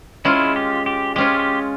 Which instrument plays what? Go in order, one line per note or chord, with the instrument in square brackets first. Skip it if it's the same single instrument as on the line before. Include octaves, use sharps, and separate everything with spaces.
[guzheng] G#3 C#4 F4 [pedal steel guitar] E4
[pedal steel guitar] G4
G4
[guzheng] G#3 C#4 F4 [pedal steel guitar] G4
[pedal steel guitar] G4